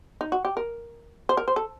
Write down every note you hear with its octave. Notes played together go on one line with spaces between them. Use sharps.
D#4
F#4
G4
A#4
C5
A#4
C5
A4